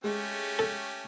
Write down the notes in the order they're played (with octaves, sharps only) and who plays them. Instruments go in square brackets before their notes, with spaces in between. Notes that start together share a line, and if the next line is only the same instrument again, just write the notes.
[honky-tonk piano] G#3 [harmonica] A3 C#4 G4
[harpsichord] A4